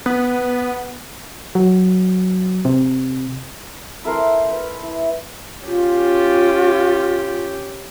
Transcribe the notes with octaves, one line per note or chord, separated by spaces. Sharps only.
B3
F#3
C3
E4 A4 A#4 C5
B4
E4
C#4 F4 G4